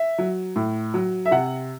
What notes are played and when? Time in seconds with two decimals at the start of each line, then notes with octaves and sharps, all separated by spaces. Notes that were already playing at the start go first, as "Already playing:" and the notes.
Already playing: E5
0.18 F#3
0.56 A2
0.94 F#3
1.26 E5
1.31 C3 F#5